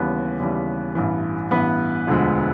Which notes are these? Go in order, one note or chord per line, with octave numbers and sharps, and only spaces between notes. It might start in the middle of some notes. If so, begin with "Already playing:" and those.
Already playing: D#2 C#3 E3 G3 B3 B4
D#2 C#3 E3 G3
A1 G2 E3
A1 G2 E3 B3 B4
E1 D2 D3 F3 G#3